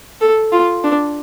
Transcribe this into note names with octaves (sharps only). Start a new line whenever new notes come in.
A4
F4
D4